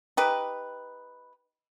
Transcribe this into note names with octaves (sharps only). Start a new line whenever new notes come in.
D#4 G4 B4